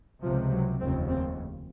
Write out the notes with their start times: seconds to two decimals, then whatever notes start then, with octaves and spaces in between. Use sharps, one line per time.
0.21 C#2 C3 F3
0.51 F#3
0.79 F1 D#2 C#3 C4
1.08 C4